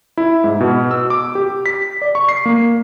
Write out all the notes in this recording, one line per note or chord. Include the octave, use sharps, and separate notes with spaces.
E4
G#2
B2
E6
D6
G4
B6
D5
C#6
C7
A#3